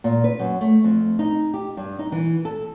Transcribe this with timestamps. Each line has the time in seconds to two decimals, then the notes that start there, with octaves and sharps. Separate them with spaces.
0.04 A#2
0.24 B4
0.39 F#2
0.61 A3
0.84 F2
1.19 D#4
1.54 G4
1.77 G2
1.99 D#4
2.12 E3
2.45 A4